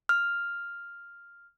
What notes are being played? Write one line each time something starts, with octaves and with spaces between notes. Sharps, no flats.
F6